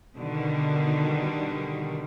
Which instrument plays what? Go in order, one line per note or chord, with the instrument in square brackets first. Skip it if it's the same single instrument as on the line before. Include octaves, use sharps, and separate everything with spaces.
[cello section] B2 D3 D#3 G3